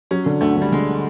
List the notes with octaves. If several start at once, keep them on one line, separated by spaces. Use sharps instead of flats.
F#3 C#4
D3
D2 A3
D3 G3
D3 G#3